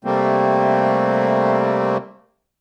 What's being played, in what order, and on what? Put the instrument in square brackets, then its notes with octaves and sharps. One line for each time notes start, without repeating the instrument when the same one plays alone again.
[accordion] C3 G3 A3 A#3 C4